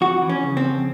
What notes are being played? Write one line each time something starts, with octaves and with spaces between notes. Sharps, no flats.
F2 F#4
E3
C#4
C#3
C4
F2